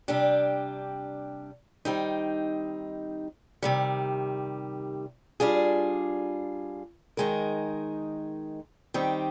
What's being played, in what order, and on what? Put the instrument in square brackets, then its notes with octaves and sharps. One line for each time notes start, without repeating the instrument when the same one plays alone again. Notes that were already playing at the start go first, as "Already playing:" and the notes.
[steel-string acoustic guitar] C3 G3 D4 G4
D#3 G3 C4 D#4
C3 D#3 G3
G3 D4 F4 G#4
D#3 G#3 D#4 A#4
D#3 G3 C4 D#4 G4